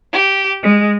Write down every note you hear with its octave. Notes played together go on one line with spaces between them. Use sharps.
G4
G#3